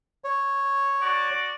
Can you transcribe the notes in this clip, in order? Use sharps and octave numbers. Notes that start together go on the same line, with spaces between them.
C#5
F#4 D5 D6